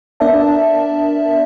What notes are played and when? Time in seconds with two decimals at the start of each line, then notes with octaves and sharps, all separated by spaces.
0.20 B3 D4 A#4 D5 E5 A5